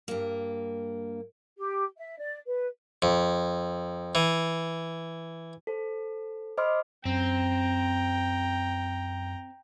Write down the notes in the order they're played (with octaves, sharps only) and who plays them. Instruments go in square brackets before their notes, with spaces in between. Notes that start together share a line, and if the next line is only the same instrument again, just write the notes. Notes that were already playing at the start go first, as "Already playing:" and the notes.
[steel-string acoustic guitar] G2 A#3
[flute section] G4
E5
D5
B4
[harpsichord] F2
E3
[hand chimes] A4 C5
C5 D#5 B5 C6 D6 F6
[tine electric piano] F#2 [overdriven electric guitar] C4 [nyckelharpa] G5 A#5